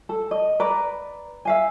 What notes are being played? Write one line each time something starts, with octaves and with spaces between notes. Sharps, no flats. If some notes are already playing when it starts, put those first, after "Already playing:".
A4
D#5
B4 D5 A#5
E5 F5 G#5